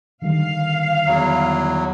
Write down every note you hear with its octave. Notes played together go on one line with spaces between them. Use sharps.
D3 D#3 G3 F5
E2 F#3